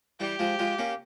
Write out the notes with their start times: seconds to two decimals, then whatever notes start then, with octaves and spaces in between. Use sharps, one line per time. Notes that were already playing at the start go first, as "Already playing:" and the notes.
0.20 E3 G3 G4
0.39 F3 G#3
0.59 F3 G#3
0.79 A#3 C#4